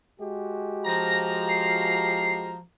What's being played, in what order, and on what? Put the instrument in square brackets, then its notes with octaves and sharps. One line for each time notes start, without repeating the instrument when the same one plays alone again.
[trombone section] G#3 F#4 G4
[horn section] F3 A#5 [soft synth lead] A#6
[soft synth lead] C7